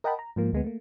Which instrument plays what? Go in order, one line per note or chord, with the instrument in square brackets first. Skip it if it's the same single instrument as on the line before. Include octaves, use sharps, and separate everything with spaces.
[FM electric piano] A#4 D#5 F#5 G5 A5 B5
A#5
G#2 F3 A#3
D2 G#3 B3
A3 A#3